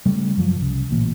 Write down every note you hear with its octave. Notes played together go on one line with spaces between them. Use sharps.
C#3 G3 A3
F#2 F3 F#3
C2 C#3
A1 A#2